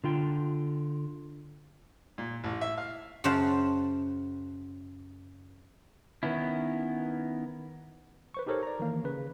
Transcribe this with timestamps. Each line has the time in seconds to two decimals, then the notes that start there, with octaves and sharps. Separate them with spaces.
0.04 D3 F4 G5
2.18 A#2
2.44 A1
2.61 E5
2.78 F5
3.24 F#2 C#3 C5 F#5 A5
6.23 D#3 B3 C#4 E4
8.34 B4 C5 C#6
8.46 D#4 G4 A4 A#4 C5 C#5
8.63 D5 A#5
8.80 D#3 E3 A#3
9.04 C#3 B4